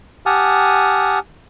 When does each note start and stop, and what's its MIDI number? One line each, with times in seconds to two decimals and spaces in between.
0.26 1.19 67
0.26 1.19 78
0.26 1.19 80
0.26 1.19 81
0.26 1.19 87
0.26 1.19 89